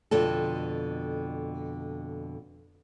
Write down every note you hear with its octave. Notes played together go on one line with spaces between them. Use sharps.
F2 B2 D3 A4